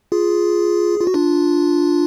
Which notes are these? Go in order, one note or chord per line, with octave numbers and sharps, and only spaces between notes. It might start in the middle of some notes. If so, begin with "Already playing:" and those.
F4 G#4
F4
F#4
D4 F4